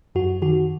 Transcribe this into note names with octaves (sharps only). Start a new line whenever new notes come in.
F#2 F#4
D#3 F#4